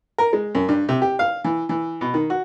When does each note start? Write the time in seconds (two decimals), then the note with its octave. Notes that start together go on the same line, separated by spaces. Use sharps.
0.18 A#4
0.33 G#3
0.55 F#2
0.69 G2
0.89 C3
1.02 G4
1.19 F5
1.44 E3
1.69 E3
2.01 B2
2.14 D#3
2.30 F#4